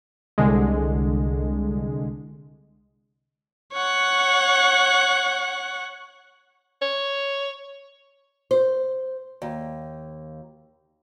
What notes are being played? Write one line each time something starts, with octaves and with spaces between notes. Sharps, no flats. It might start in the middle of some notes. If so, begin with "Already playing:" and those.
C2 D3 G#3
C#5 F#5
C#5
C5
D#2